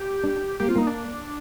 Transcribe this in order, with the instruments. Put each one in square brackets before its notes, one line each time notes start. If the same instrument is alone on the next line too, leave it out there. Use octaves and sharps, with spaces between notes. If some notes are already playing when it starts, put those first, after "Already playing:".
Already playing: [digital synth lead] G4
[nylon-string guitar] D4
[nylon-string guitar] A#3 [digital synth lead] G4
[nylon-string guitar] C4 [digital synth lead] F4
[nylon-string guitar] A#3 [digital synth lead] D#4
[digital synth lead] D4